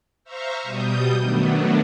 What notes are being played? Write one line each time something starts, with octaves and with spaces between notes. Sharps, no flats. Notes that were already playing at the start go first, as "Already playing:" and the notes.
C5 E5 F5 A#5 C#6
B2 G3 D#6 G6
D#3 F#3 A3 B3 D4